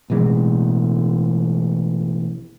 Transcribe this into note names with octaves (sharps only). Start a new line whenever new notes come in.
A1 B2 E3 G#3